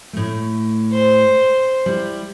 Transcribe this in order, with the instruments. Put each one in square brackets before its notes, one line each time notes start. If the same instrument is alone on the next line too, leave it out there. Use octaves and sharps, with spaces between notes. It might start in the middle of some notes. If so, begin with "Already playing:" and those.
[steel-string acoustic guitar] A2 A3
[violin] C5
[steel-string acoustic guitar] G3 E4